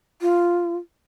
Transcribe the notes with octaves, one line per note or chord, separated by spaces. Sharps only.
F4